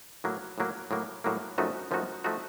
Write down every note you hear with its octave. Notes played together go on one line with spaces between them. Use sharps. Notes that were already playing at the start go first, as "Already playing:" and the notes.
A2 F#3 A#3
A2 F#3 A#3
A2 F#3 A#3
A2 F#3 A#3
F#2 F3 A3 D#4 F#4
F#2 F3 A3 D#4 F#4
F3 A3 D#4 F#4